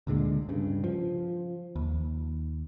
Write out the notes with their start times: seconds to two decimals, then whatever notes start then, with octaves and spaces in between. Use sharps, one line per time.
0.07 D2 A#2 D3 G#3
0.49 G2 C#3
0.84 F3
1.76 D#2